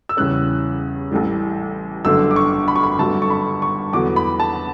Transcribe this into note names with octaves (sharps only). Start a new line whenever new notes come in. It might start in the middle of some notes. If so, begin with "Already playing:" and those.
E6
E2 C#3 G3 C#4 F#6
A1 A2 G3
G1 F#2 D3 A3 E6
D6
C#6
B5
C#6
B5
G1 G2 D3 F#3 A3 A5
C#6
B5
C#6
E2 D3 F#3 B3 D6
B5
A5